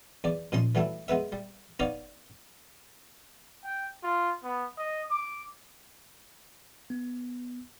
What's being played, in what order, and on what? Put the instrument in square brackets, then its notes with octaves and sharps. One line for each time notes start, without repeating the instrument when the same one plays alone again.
[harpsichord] E2 D5
A#2 F3 C#4 D#5 C6
E3 F#3 G3 A3 E4
G#3 B3 B4 E5
G3
B3 D#4 C#5 D5 F5
[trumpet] G5
F4
B3
D#5
D6
[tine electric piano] B3